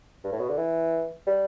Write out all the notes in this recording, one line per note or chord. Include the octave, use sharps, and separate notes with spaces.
G2
A2
B2
D3
E3
G3